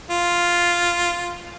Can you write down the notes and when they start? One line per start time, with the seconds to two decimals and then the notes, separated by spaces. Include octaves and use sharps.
0.10 F4